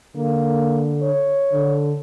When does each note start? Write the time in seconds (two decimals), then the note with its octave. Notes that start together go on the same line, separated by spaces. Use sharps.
0.16 D3 A#3
1.02 C#5
1.53 D3